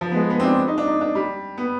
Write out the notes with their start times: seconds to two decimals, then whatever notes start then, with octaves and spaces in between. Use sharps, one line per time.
0.01 F3
0.11 B3
0.15 G#3
0.30 B3
0.40 C4
0.44 D4
0.68 D#4
0.78 D4
0.87 D#4
1.01 D4
1.15 G3
1.58 B3